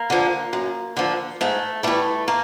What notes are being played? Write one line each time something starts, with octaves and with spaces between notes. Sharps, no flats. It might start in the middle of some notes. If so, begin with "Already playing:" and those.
Already playing: A#3
D3 F3
F#2
D3 F3
G#2 A3
E3 G3 A3
A#3